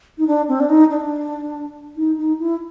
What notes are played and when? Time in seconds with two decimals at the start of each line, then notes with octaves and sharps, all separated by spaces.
0.18 D#4
0.27 D4
0.48 C4
0.60 D4
0.70 D#4
0.91 D4
1.97 D#4
2.18 D#4
2.40 E4